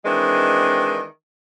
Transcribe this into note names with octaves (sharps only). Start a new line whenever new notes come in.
D#3 E3 G#3 C4 D4